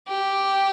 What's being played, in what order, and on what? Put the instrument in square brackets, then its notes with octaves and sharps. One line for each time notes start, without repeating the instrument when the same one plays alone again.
[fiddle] G4